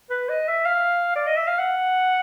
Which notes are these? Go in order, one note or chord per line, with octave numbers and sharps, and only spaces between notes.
B4
D#5
E5
F5
D5
D#5
E5
F5
F#5